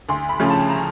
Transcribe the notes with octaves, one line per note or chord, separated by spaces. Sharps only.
D2 C6
B5
C#3 F3 A3 C#4
A5
A#5